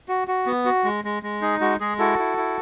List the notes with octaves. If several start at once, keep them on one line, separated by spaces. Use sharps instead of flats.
F#4
F#4
B3
F#4
G#3
G#3
G#3
D#4 G#4
G#3 F#4
G#3 G#4
E4 F#4 A4
E4
E4